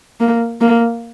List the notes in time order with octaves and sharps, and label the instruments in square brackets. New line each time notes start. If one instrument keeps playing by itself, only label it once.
[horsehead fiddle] A#3
A#3